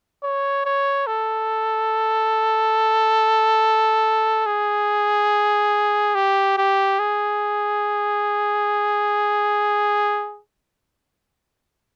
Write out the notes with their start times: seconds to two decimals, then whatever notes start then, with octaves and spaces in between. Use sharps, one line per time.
0.23 C#5
0.65 C#5
1.07 A4
4.46 G#4
6.15 G4
6.58 G4
6.99 G#4